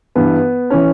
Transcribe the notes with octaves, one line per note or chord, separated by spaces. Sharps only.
G2 E3 B3
E3 C#4